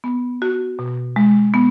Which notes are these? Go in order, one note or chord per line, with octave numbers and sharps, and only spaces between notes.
B3
F#4
B2
G#3
B3